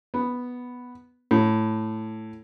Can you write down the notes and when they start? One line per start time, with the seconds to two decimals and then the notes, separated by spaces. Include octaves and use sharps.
0.14 B3
1.31 A2